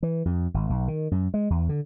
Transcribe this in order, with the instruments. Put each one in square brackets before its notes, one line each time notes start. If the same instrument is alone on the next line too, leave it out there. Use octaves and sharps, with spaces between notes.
[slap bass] E3
F2
G#1
B1
D#3
F#2
G#3
E2
D3